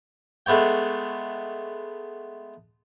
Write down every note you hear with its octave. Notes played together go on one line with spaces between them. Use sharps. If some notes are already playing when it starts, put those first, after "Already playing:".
G#3 A3 B3 C#5 G5